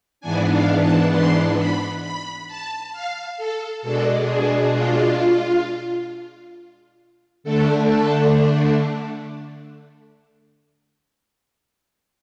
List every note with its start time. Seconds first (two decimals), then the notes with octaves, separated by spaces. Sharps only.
0.21 G#2 E3 B3 D4 G#5
0.51 F5
0.81 A5
1.11 C6
1.57 B5
2.02 B5
2.47 A5
2.92 F5
3.37 A4
3.82 B2 G#3 D4 A4
4.27 G#4
4.73 F4
7.44 D3 A3 D4 A4
7.88 A4